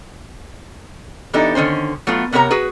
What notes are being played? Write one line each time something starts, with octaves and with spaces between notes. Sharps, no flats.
E3 B3 D4 D#4 G4 A4
D3 D#3 C#4 C5
F#3 A3 B3 F4
C3 B3 G4 A#4 C#5 A#5
F#4 G#4 B4